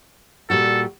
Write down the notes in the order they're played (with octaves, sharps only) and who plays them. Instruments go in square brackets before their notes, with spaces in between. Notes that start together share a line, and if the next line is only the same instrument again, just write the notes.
[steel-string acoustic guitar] A#2 G3 F#4 [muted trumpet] A4